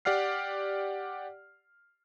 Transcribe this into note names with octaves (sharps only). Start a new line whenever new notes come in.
G4 D5 F#5 F6 C7